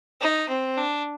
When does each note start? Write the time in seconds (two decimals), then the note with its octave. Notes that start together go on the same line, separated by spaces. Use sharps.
0.22 D#4
0.49 C4
0.77 D4